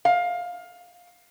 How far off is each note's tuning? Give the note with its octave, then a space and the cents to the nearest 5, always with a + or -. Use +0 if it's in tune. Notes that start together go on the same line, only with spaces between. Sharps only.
F5 +20